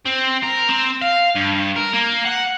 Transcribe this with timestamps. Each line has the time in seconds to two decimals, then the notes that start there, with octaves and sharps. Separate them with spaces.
0.06 C4
0.43 A#4
0.69 C4
1.01 F5
1.36 G2
1.76 A#4
1.94 A#3
2.25 F#5